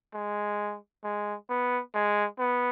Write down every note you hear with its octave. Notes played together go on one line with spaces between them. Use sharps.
G#3
G#3
B3
G#3
B3